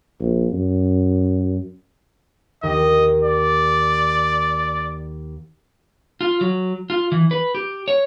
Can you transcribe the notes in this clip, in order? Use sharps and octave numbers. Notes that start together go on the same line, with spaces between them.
A#1
F#2
D#2 D#5
D5
F4
F#3
F4
E3
B4
G4
C#5